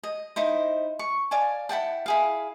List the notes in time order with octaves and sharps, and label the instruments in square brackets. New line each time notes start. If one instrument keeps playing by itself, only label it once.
[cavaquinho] D#5
D#4 E4 C5
C#6
D5 F5 G#5 A5
E4 F#5 G5 A5
E4 G#4 F5